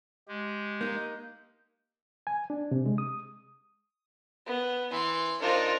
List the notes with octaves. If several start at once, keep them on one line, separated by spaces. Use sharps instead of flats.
G#3 G4
A#3 D#4 G6
G#5
D4
C3
G#3
D#6
B3
E3 C6
D4 D#4 F4 A#4 C5